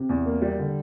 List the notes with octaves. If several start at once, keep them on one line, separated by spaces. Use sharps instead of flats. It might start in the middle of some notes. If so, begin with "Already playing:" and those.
Already playing: C3
E2
A#3
G3
D3